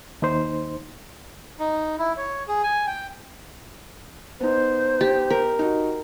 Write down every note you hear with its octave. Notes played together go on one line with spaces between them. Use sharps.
D#2 D#4 C5
D#4
E4
C#5
G#4
G#5
G5
B3 D#4 C5
G4
A#4
D#4 F#4